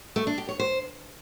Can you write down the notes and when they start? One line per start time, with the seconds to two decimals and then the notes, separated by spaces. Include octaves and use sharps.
0.16 A3
0.27 D4
0.38 G4
0.49 C#5
0.60 C5